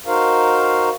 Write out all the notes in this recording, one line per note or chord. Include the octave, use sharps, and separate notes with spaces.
D#4 F#4 A#4 C5 F5